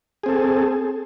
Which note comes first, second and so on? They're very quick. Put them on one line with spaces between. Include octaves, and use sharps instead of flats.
G#4 C4 A4